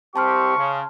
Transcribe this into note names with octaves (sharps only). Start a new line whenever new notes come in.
C2 C4 G4 A5 C6 C#6 F6
C#3